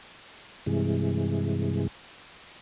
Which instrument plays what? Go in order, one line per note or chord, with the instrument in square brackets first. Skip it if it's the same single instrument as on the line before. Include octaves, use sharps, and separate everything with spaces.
[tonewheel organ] G2 C3 E3 G#3